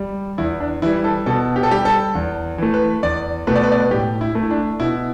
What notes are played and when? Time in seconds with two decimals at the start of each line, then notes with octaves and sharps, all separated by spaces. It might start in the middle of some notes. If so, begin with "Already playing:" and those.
Already playing: G3
0.38 E2 E4
0.60 D4
0.82 E3 G3 E4
1.04 A4
1.26 B2 A4
1.56 G4
1.63 A4
1.71 G3 G4
1.85 A4
2.15 E2
2.58 E3 A3
2.74 B4
3.03 E2 D5
3.47 B2 A3 B4
3.55 D5
3.63 B4
3.71 D5
3.80 B4
3.91 A2 G4
4.21 E4
4.35 A3
4.43 E4
4.51 D4
4.80 B2 E4